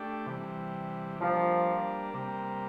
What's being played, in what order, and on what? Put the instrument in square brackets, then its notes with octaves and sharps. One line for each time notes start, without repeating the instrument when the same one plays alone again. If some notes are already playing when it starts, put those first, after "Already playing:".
Already playing: [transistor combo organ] A3 D4 G4
C3 E3 G3
[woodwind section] F3 [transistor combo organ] G3 A#3 D4
[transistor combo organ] C3 G3 A#3